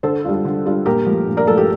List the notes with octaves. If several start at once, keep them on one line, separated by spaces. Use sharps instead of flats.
D3 A4 C5
G3 D4 F4
D3
G3 D4 F4
A#2 G4 A#4
F3 A3
A#2
A#4 D5
F3 A3 A4
G4